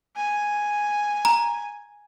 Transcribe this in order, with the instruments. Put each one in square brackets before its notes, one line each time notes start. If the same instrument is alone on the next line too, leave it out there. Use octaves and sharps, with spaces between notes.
[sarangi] G#5
[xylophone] A#5